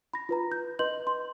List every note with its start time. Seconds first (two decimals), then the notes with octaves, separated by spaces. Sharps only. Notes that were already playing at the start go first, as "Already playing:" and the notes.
0.14 B5 A#6
0.29 F4 B4 A#5
0.52 G6
0.79 B4 D#5 C6 G6 F#7
1.07 C6